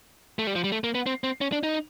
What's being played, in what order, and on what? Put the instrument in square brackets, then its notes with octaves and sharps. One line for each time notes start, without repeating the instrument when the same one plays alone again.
[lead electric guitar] A3
G3
F3
G3
A3
A#3
B3
C4
C4
C#4
D4
D#4